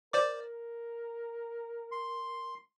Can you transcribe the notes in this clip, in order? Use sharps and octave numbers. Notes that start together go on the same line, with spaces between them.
A#4 C5 D5 D6
C6